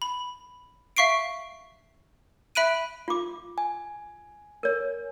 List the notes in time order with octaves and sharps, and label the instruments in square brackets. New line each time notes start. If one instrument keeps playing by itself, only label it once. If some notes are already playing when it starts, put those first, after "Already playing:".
[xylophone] B5
E5 F5 C#6 C7 D7
E5 B5 F#6 D7 D#7
[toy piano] F4 D6
[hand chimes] G#5
[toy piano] A#4 C#5